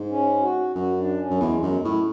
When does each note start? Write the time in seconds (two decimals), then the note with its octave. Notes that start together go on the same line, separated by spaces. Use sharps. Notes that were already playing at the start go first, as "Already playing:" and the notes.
Already playing: G#2
0.11 C#4
0.42 F#4
0.75 F#2 F#4
0.97 D4
1.18 C#4
1.30 F#2
1.40 E2 G#3
1.63 F#2
1.85 A2